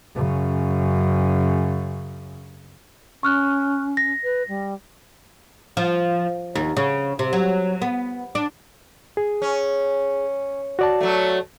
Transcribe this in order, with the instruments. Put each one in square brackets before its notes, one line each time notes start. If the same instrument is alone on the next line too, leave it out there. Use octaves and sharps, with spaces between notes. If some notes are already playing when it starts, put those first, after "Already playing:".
[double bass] F#2 C#3
[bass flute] C#4 [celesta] C#6 F6 F#6
[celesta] A#6
[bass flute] B4
G3
[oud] F3
D#2
C#3
C3
F#3
B3
D4
[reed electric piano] G#4
[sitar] C#4
[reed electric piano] F#4 D5 A5
[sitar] F#3 A3